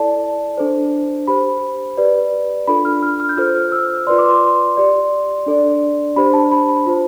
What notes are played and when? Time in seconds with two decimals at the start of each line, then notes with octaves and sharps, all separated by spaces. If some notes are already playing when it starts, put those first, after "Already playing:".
Already playing: E4 A4 D5 A5
0.58 D4 A4 C5
1.27 G4 C5 B5
1.98 G4 B4 D5
2.67 D4 F4 A4 B5
2.85 F6
3.02 F6
3.20 F6
3.29 G6
3.37 F4 A4 C5 F6
3.72 E6
4.07 F4 B4 D5 C6
4.18 D6
4.29 C6
4.77 G4 D5
5.46 D4 A4 D5
6.16 D4 G4 C5 B5
6.33 A5
6.51 B5
6.69 B5
6.86 F4 C5